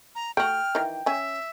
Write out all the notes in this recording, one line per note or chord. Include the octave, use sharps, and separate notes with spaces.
A#5
A3 F#4 G5 F6
D#3 E3
C#4 E5 G#5